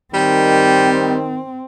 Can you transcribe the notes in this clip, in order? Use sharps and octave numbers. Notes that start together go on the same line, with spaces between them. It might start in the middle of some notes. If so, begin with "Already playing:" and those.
D#3 G3 C4